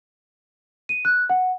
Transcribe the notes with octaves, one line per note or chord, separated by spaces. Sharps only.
D#7
F#6
F#5